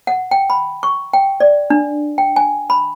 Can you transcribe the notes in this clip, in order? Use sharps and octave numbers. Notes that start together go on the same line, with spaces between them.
F#5
G5
B5
C#6
G5
D5
D4
G5
G#5
B5